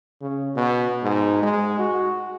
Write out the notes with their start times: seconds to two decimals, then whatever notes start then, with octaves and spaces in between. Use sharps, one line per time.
0.22 C#3
0.56 B2
1.03 G#2
1.43 G#3
1.79 F#4